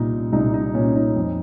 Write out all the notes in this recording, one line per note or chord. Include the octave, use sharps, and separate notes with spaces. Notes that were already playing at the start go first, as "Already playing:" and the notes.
Already playing: C2 A#2 D#4
C2 D#4
D#4
A#2 C#4
D#4
F2